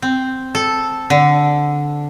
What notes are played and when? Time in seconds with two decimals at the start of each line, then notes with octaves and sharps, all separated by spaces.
0.02 C4
0.55 A4
1.10 D3